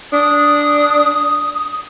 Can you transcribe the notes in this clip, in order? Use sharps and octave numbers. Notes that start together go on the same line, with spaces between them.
D4 D#6